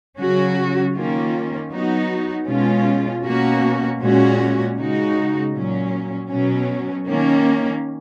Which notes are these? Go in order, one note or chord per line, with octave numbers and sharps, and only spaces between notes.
C#3 F#3 C#4 F#4
D#3 A#3 C#4 F4
F#3 B3 D#4 F#4
B2 G#3 C#4 F4
B2 A#3 C#4 F#4
A#2 G#3 C#4 F#4
C#3 G#3 D#4 F#4
A#2 F#3 C#4
B2 F#3 C#4
D#3 A#3 C#4